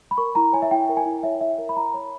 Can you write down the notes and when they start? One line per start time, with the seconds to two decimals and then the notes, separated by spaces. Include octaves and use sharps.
0.11 B5
0.18 A#4 C#6
0.35 E4 A#5
0.53 C#5 G#5
0.62 E5
0.71 E4 G5
0.89 A#4
0.97 G#5
1.06 E4
1.23 C#5 E5
1.41 E4 E5
1.58 A#4
1.69 B5
1.76 E4 A#5
1.94 C#5 B5